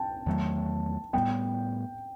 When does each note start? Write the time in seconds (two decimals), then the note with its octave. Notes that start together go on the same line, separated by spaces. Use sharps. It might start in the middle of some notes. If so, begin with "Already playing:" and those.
Already playing: G5 A5
0.26 E2 D#3 F#3 A3
1.13 A2 G3 B3 G5